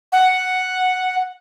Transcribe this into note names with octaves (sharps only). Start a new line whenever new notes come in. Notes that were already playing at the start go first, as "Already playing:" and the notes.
F#5